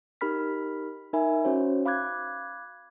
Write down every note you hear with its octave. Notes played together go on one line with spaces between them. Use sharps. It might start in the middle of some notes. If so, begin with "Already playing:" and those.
D#4 G4 A#4 B5 F6 B6
D#4 A#4 E5 G#5 B5
C#4 F#4 C5 C#5
F5 B5 D6 F#6 G#6